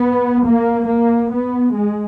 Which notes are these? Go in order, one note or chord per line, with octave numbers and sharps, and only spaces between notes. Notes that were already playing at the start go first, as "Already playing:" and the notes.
Already playing: B3
A#3
A#3
B3
G#3